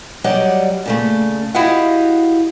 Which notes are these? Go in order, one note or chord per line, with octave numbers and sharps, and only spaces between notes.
F#3 G3 D5 D#5 F#5
A#2 C#3 A3
E4 F#4 G4 D#5 F5 F#5